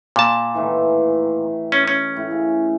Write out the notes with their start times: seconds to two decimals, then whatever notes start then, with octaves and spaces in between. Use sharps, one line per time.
0.16 A#2 A5
0.54 A2 D#3 E3
1.72 C#4
1.88 C#4
2.16 A2
2.31 C#3